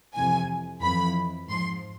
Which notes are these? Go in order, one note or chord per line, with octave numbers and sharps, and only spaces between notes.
F2 C3 E3 G#5
F2 E3 B5
G#2 F3 C6